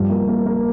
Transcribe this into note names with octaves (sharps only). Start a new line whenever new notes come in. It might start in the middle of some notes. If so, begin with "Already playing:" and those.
Already playing: G2 F3
A#3
A#3
A#3